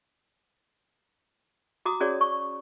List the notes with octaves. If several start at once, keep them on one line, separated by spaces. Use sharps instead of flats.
F#4 A#5 D6 D#6
C#4 F#4 G#4 C#5 D5
C#6